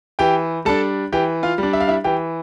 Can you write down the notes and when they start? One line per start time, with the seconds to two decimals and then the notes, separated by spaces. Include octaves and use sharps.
0.19 E3 G4 G5
0.65 G3 D4 A4 A5
1.12 E3 G4 G5
1.43 F4 F5
1.58 G3 D4
1.73 E5
1.81 F5
1.88 E4 E5
2.04 E3 G4 G5